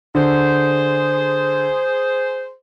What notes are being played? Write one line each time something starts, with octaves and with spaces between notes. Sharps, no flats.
D3 G#4 C5